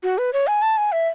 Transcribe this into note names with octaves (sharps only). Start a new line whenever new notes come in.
F#4
B4
C#5
G#5
A5
G#5
E5